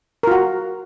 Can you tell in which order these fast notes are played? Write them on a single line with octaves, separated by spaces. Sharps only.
A#4 F4 F#4